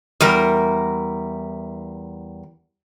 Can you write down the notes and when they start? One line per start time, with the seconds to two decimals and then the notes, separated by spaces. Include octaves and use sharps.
0.21 E2 G3 A#4